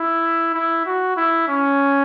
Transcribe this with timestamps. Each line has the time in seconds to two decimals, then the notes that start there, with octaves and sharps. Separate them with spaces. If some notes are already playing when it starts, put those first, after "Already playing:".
Already playing: E4
0.54 E4
0.86 F#4
1.17 E4
1.48 C#4